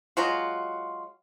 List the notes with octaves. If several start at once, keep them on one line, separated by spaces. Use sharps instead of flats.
F#3 G#3 F4 F#4